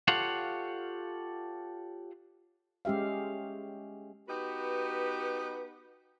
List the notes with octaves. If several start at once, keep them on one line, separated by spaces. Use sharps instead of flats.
F4 G4 A4 C#5 F5 F#5
G#3 C#4 G4 E5 F5
B3 D#4 F#4 G4 B4